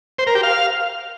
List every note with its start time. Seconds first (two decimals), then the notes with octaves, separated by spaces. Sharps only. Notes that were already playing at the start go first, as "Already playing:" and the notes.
0.19 C5
0.27 A#4
0.35 G4
0.43 F5